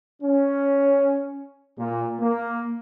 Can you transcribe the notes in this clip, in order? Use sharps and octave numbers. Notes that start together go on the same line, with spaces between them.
C#4
A#2
A#3